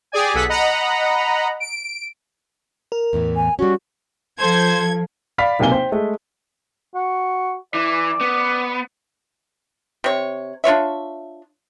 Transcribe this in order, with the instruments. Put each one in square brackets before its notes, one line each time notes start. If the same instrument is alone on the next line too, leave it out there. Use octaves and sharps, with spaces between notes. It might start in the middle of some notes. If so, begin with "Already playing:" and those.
[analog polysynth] G4 G#4 D5 G#5
B1 G#4 A4 F#5 B6
D#5 F#5 A#5 B5
D7
[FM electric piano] A#4
[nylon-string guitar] E2 A2 E3
[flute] G#5
[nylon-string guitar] G3 C#4 [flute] F#4
[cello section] F3 [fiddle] A4 [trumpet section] C5 [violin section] G#6
[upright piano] D5 F5 B5 B6
B1 C3 A#3 G#5 G7
C5 G5
G#3 A3
[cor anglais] F#4
[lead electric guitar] E3 [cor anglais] D5
[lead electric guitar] B3
[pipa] C3 C#5
D4 F4 C#5 E5